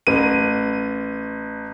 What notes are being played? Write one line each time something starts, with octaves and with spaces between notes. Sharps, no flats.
A1 D#7